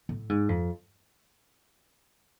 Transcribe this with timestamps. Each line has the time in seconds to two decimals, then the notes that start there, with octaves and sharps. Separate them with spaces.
0.09 A2
0.29 G#2
0.49 F2